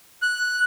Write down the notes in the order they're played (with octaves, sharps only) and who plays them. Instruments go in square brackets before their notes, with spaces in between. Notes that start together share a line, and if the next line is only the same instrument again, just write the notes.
[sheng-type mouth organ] F#6